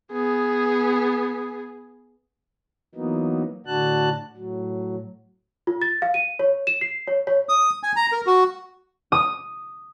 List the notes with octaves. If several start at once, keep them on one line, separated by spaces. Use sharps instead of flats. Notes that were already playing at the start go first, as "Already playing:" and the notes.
B3 G#4
E3 F#3 A#3 B3 D#4
A2 D3 D4 F#4 A5 F#6
A2 F#3
F4
A6
F5
D#7
C#5
E7
C7
C#5
C#5
D#6
G#5
A#5
A#4
F#4
D#6